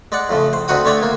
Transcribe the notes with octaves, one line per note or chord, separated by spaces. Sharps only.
G#3 D5 F#5
F2 A2 C#3
C5
D2 C4 D#4 F#4 F#5 D#6
D3 A3 C#5 D5 G5
A#3